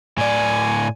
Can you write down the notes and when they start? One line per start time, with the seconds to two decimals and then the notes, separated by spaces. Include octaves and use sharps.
0.18 A2 D5 G#5